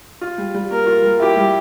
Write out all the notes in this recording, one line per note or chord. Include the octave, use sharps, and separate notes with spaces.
F4
G3
G3
A#3 A#4
F4
G3
E4 G4
G3